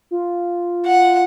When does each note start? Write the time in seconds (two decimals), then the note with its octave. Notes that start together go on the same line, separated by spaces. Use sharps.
0.11 F4
0.86 F#5